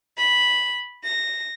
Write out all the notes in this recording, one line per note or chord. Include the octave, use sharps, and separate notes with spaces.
B5
A#6